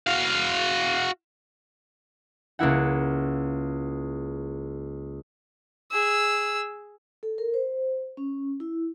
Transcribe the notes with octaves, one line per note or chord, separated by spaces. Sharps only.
F#4 F5
C#2 A#3 E4 F#5
G#4 E6
A4
A#4
C5
C#4
E4